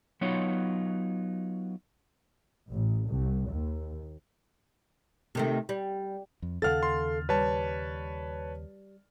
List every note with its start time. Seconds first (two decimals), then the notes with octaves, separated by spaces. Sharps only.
0.21 F#3 B3 D#4 F4 C#5
2.69 A1
3.08 C2
3.49 D#2
5.35 C3 D#3 A3
5.69 G3
6.42 F2
6.62 D#2 C#3 A4 F5 F#5 F6 A6
6.83 C6
7.29 G3 B4 C#5 A5